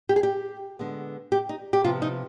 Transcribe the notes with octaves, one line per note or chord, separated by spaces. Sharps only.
G4
G#4
G4
D3 G#3 B3
G4
D#4
G4
C3 F3 B3 F4
D#4